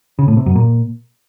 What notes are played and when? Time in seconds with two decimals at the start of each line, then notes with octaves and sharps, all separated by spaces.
0.19 C#3
0.28 A2
0.37 C3
0.46 F#2
0.55 A#2